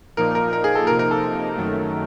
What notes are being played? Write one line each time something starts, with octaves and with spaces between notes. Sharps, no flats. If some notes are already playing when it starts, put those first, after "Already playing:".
A#2 F3 A#3 D#4 A#4
A#4
A#4
G#4
A4
C3 F3 A#3 D#4 A#4
A#4
A4
F#2 D#3 F#3 A3